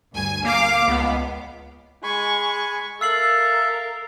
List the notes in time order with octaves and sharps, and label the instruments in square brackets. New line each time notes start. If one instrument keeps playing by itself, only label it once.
[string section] D2 G2 G#5
[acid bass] A#3 [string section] F5 D6
[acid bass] C#2 [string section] B3
[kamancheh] G#3 C#6 [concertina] G#5 B5
[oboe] A4 [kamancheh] A#4 [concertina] E5 F5 [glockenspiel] E6 C7 F#7